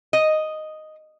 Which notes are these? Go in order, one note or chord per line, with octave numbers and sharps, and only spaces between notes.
D#5